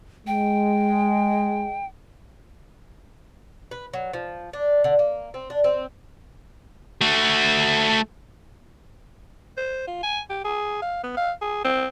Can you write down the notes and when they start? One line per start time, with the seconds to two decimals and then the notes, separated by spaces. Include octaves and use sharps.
0.27 G#3 G5
3.71 B4
3.93 F#3
4.14 F3
4.53 D4
4.84 D3
4.99 A#3
5.34 C4
5.50 D4
5.64 C4
7.01 A3 F#4
9.57 C5
9.88 F4
10.03 G#5
10.30 G4
10.45 G#4
10.82 F5
11.04 B3
11.17 F5
11.42 G#4
11.65 C4